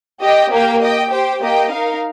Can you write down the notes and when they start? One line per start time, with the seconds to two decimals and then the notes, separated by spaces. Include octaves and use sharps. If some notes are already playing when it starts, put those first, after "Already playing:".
0.22 G4 D#5 G5
0.52 A#3 G4 A#4 G5
0.82 G4 D#5 G5
1.11 G4 C5 G5
1.42 A#3 G4 D#5 G5
1.71 D#4 A#4 F5